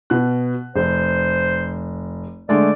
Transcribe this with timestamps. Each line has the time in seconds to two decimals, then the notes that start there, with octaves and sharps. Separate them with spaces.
0.10 B2 F#6
0.76 F1 C5
2.49 D3 G#3 A3 D5